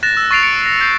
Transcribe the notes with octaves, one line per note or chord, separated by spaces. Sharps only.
F#6 A6 A#6 E7
E6
C#6 A6 C7 D7 F7
C#7 D7 F7
A#6
G6 C7